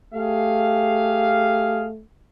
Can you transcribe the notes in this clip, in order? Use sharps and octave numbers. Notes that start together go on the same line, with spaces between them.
A3 G4 G#4 F5